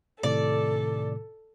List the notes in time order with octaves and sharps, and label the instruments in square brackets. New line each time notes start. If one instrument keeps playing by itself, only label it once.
[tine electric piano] A2 C3 D#3 [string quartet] A4 [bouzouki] D5